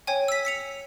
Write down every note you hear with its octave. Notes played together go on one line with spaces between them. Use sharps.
C#5 G5 G#5
E6 B6
B6 C#7 F7